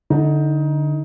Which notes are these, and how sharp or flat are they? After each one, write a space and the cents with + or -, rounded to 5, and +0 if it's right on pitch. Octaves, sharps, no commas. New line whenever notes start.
D3 +0 D#4 +20